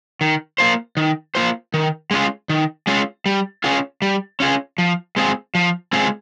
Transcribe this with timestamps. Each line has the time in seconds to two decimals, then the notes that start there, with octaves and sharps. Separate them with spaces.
0.21 D#3
0.58 A#3 F4 C5
0.97 D#3
1.35 A#3 F4 C5
1.74 D#3
2.11 G#3 C#4 F4
2.49 D#3
2.87 G#3 C#4 F4
3.26 G3
3.64 C#4 F4 G#4
4.02 G3
4.40 C#4 F4 G#4
4.78 F3
5.16 G#3 C4 F4 G#4
5.55 F3
5.93 G#3 C4 F4 G#4